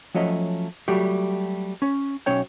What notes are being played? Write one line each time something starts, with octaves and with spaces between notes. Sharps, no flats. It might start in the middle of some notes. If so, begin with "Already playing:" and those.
F3 F#3 A3 C#4 D#5
F#3 G3 A3 F#4 G4
C#4
B1 C#4 C#5 G5